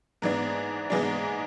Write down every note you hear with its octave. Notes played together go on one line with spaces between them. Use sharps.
G#2 E3 G#3 B3 D4
G#2 E3 G#3 B3 D4